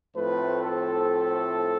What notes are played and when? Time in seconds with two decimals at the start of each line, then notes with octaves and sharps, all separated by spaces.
0.16 A2 F3 A3 C4 B4
0.61 A4